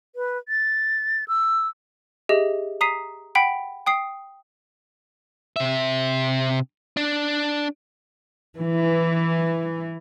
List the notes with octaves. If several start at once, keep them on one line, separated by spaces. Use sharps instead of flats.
B4
A6
E6
G4 G#4 D#5 E5
A#5 D#6 B6 C7 D#7
F#5 G5 B5 B6 D7
G5 D#6 C7
C3 E5
D4
E3